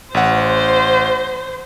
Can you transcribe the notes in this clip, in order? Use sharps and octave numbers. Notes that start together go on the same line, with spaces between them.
A1 C5 F#5